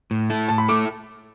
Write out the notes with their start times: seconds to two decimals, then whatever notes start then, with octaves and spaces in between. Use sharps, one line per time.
0.11 A2
0.30 A3 E4 A4
0.48 A2 A5
0.58 B5
0.68 A3 E4 A4 D6